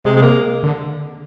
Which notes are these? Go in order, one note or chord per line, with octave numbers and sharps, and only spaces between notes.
C3 G#3
G#3
A#3
D3